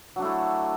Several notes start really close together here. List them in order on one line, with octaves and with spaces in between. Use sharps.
F#3 D4 A3 E4